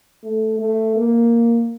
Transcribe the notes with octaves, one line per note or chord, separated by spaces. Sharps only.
A3
A3
A#3